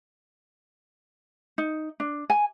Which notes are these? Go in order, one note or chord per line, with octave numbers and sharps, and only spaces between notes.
D#4
D4
G#5